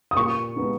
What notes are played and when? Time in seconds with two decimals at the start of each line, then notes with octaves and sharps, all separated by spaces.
0.11 D#6
0.17 A#2 C#6
0.56 G#3 B3 D#4